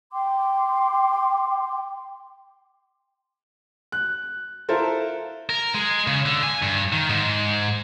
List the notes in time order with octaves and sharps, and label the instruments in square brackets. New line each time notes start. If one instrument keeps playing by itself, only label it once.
[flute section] G5 C6 D6
[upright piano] F#6
E4 F4 A4 A#4 C5
[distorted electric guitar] A#4
G#3
C#3
D3
G#5
G2
D#3
G#2